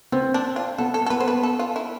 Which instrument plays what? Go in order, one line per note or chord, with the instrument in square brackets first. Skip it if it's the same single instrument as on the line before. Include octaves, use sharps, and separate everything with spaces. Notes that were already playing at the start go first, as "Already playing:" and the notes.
[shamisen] B3 [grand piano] C4
[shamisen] D4
F4
[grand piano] B3 [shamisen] A4
[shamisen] A4
A4
[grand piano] B3 [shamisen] B4
[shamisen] C5
B4
A4
F4
E4